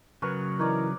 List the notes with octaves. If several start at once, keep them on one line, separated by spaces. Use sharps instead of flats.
C#3 F#3 A#4 B4 C#6
E3 D#4 A#4 C#5 D5